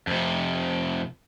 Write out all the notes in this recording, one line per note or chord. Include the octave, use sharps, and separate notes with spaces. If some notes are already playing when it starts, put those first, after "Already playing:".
F2 C3